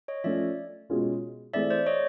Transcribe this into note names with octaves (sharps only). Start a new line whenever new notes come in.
C#5 D#5
F3 A3 C#4 D5 E5
B2 G#3 C#4 F4 G#4
E3 A3 C4 E4 G#4 D5 E5
C5 D5
C#5 D#5